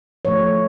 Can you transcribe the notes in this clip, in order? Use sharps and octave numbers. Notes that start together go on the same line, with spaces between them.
F3 A3 C#5